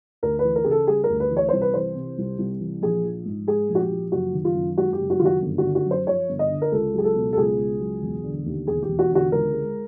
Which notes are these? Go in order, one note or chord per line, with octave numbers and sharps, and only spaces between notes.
D2 A#4
B4
E3
A#4
C#3 G#4
A4
G3 G#4
A#4
D2
B4
E3
C#5
C2 C5
B4
E3 C5
C3
C2
C2
E3
A#1 G#4
F3
G#2
G#3 G#4
A#1
F#4
G4
F3
F#1 F#4
D#3
F4
F#2
G#3 F#4
G4
F#1
F#4
D#3 F4
F#4
G1
F#4
D3
F#4
F#2 C5
F3 C#5
G1
D#5
D3
A#4
C#2 A4
F#3 G#4
A4
B2
A4
C#2 G#4
C#2
F#3
E1
D3
D#2
E1 G#4
G4
E1
F#4
D3 F#4
C#2 A#4
G#3